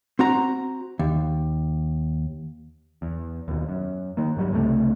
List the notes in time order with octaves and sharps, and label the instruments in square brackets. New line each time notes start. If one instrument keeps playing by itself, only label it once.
[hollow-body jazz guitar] C4 F#4 A#5
D#2
[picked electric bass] E2
D#2 B2
F#2
D#3 A#3
G2 F#3 G3
C#2 C3 F#3 A3